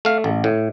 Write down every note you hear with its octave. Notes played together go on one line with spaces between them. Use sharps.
A3 F5
A1
A2